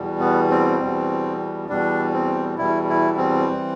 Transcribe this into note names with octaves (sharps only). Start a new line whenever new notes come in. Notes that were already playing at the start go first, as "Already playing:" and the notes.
Already playing: E2 B2 G3
B3
C4
E2 B2 G3
E2 B2 G3 D4
C4
E2 B2 G3 E4
E4
C4
E3 G3